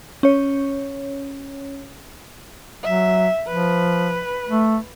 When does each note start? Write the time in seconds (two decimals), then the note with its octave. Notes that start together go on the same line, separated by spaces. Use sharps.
0.23 C#4 C#5
2.83 F#3 E5
3.47 F3 B4
4.49 A3